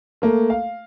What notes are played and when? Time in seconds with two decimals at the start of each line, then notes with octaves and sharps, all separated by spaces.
0.22 A3 A#3
0.50 F5